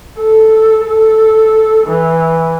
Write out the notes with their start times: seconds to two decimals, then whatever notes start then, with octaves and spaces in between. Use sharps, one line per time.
0.20 A4
0.86 A4
1.88 E3